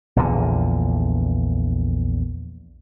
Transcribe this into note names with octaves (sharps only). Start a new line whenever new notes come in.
A#1 E2 A#2 D3